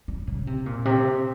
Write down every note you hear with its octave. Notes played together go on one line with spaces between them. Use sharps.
G3
C#3
C3
A#2
C3